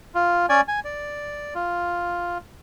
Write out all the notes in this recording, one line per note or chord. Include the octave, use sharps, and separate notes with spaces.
F4
C#4 D5 G#5
G#5
D5
F4